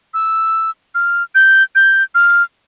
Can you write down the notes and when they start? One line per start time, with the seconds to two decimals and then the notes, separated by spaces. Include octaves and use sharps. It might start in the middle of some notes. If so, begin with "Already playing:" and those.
0.14 E6
0.95 F6
1.35 G6
1.75 G6
2.15 F6